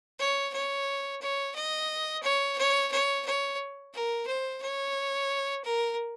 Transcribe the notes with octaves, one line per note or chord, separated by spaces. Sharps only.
C#5
C#5
C#5
D#5
C#5
C#5
C#5
C#5
A#4
C5
C#5
A#4